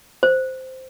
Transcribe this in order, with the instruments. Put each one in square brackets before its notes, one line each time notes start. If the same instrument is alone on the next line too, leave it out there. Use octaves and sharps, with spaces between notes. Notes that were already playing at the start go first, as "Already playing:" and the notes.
[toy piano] C5